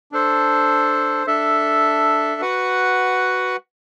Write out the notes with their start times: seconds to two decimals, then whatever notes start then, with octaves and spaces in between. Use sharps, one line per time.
0.12 D4 A4 C5
1.27 D4 A4 E5
2.41 F#4 B4 F#5